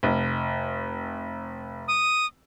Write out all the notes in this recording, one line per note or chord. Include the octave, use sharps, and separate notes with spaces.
F1
D#6